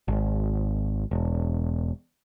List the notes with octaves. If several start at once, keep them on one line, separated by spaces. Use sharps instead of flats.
G#1
E1